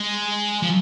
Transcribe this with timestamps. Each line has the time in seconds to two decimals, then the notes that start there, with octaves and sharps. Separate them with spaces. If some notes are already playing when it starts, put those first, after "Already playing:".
Already playing: G#3
0.63 F3